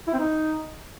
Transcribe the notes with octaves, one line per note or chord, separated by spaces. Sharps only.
E4
C4
D#4